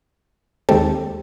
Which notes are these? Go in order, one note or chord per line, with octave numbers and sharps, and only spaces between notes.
D#2 D#3 G#3 C4 G4 A4